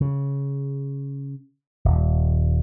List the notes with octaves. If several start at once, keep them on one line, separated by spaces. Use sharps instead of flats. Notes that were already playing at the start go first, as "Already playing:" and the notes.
C#3
D#1